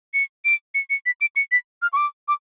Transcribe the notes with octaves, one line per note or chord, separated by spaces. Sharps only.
C#7
D7
C#7
C#7
B6
D7
C#7
B6
F6
C#6
D6
D6